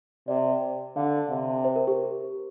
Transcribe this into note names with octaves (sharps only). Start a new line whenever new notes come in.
C3 D5
D3 F5
C3
C5
A#4
G4